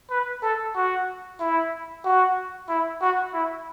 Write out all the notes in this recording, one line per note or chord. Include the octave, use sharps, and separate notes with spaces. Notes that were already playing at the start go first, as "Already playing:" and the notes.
B4
A4
F#4
E4
F#4
E4
F#4
E4